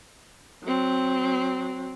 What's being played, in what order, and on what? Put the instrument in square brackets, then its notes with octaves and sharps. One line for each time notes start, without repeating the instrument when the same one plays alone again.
[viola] F#3 C4